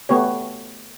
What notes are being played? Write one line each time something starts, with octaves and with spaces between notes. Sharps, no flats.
A3 B3 G4 C#5